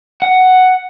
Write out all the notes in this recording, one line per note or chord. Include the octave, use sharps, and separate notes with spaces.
F#5